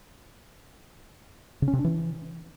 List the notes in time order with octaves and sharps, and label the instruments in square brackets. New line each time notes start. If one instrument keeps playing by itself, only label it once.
[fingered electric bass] C#3
C#4
C3
D4
E3